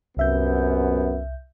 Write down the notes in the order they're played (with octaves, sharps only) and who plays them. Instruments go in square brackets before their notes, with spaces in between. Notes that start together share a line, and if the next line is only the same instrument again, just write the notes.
[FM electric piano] C2 E5 G6 [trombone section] F#2 C3 B3